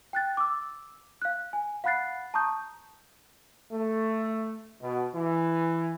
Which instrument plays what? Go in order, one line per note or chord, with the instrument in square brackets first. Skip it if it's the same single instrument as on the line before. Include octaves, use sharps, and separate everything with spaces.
[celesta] G5 F#6 A6
D6 E6
F5 F#6
G#5
F5 F#5 B5 F#6 A6 C7
A5 A#5 C#6 D#6 G6
[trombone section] A3
B2
E3